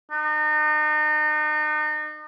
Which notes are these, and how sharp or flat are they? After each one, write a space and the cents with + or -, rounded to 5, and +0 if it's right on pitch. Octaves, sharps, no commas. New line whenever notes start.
D#4 -40